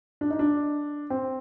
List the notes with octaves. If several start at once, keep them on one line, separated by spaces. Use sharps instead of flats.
D4
D#4
D4
C4